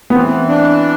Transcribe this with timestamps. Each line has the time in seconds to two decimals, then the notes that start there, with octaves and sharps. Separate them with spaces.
0.10 B3
0.15 E3 C4
0.48 D4